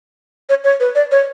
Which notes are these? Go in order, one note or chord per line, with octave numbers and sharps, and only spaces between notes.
C#5
C#5
B4
D5
C#5